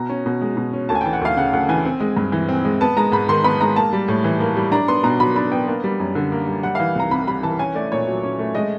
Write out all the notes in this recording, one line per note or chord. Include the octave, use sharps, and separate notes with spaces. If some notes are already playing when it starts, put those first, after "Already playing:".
Already playing: B2 A#5
C#4
B2
G#3
B2
C#4
D2 A5
G#5
E3 G5
F#5
D2 F5
C#3 F#5
D2 F#5
E3 G#5
C4
G#3
G2
E3
C4
G#3
B3 A5
G#3 A#5
G#2 B5
D#3 C6
B3 B5
G#3 A#5
A#3 A5
G3
A2
E3
A#3
G3
D4 A#5
B3 C6
B2 A#5
F#3 B5
D4 B5
B3 G5
A#3
G3
F#2
D3
A#3
G3
G3 F#5
E3 F5
C2 A#5
C3 B5
G3 B5
E3 A5
C#4 G#5
A3 D5
A#2 C#5
F#3
C#4
A3
G#3 D#5